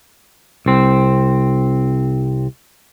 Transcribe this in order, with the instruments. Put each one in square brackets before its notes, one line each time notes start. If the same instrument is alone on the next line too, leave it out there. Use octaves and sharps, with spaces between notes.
[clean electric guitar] C2 C4